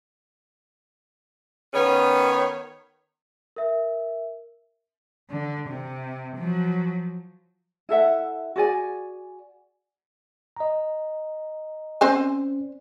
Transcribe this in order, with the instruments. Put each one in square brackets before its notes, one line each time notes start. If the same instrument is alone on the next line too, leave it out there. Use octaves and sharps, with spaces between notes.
[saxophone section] D#3 B3 C#4 C#5
[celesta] A#4 E5
[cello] D3
C3
F3 F#3
[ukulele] E4 A4 E5 F#5
F#4 G#4 D5 G#5
[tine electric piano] D#5 A#5
[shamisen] C4 C5 G#5 [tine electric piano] C#4 D5